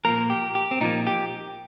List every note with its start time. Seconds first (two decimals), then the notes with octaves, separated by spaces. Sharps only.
0.05 A#2 F3 A#3 A#4
0.30 G4
0.55 G4
0.71 C4
0.81 A#2 F3 A#3 D#4
1.07 G4